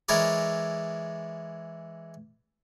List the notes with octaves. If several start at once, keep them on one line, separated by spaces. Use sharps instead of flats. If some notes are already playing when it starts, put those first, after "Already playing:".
E3 G#3 E4 A#4 C#5 D5